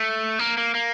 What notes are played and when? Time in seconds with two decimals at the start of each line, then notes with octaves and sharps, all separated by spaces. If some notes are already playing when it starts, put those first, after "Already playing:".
Already playing: A3
0.39 A#3
0.58 A#3
0.75 A#3